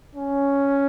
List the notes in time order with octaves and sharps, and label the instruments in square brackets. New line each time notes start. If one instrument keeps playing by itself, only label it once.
[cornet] C#4